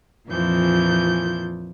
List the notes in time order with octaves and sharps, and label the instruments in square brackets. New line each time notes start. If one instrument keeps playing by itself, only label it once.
[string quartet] F2 A#2 E3 F3 G6